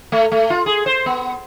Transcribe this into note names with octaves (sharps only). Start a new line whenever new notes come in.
A3
A3
F4
G#4
C5
B3